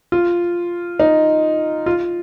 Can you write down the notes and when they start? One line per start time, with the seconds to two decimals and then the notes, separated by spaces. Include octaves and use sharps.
0.12 F4
1.00 D#4
1.86 F4